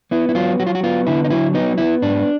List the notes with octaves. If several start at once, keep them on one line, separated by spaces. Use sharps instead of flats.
B3 E4
E4
F#3 F4
F#3 F#4
F4
F#4
B3 F4
D3 E4
D#4
F#3 E4
B3 D#4
B3 E4
G#2 D4